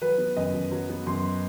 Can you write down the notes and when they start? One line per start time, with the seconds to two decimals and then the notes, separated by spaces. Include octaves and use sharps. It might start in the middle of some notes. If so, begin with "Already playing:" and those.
0.02 F#3 B4
0.18 B3
0.37 F#2 D#5
0.54 F#2
0.72 F#3
0.90 B3
1.07 F#2 C6